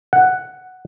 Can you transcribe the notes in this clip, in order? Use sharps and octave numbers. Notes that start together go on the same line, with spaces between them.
F#5